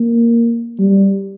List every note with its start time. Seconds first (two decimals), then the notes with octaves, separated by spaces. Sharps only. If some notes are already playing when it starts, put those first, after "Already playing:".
Already playing: A#3
0.79 G3